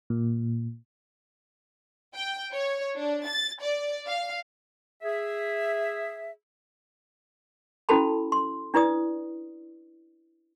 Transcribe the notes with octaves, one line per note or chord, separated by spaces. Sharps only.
A#2
G5
C#5
D4
A6
D5
F5
G#4 E5
C#4 E4 F#4 A4 A5 B5
C6
D4 E4 B4 D5 D#6